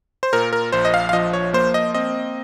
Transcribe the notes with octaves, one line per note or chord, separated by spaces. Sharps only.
C5
A#2 A#4
A#4
A#1 C5
D#5
F5
F5
F3 D#5
C#5
A#3 C5
D#5
C4 D#5